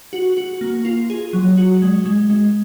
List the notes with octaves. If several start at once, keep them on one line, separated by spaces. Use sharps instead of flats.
F#4
F#4
A#3
F4
G#4
F#3
F#4
G#3
G#3
G#3